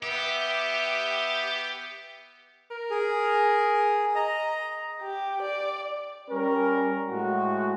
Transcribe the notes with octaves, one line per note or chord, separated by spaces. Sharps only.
B3 G4 E5
A#4
G#4
D#5 A#5
G4
D5
G3 C#4 A#4
A2 G#3 F#4